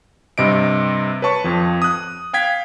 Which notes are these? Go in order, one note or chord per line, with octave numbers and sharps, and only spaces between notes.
G2 C3 D#5 D7
B4 C#5 A5 C#6
F2 F3
D#6 F#6
F5 G5 G#6 B6